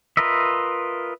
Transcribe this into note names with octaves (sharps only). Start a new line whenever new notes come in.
F4 A#4 B4 D#5 E5